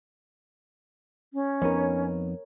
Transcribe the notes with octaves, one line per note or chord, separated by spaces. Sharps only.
C#4
F2 B3 D#4 A#4 C#5